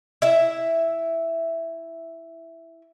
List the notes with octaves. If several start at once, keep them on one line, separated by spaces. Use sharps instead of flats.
E4 E5